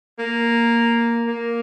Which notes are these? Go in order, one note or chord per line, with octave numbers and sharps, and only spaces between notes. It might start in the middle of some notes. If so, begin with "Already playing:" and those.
A#3
A#3